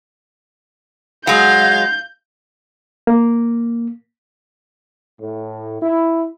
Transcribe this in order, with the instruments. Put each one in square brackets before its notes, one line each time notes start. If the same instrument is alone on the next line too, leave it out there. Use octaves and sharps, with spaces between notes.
[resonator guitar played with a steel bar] F#3 G#3 [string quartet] F5 [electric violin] G6
[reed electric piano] A#3
[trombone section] A2
E4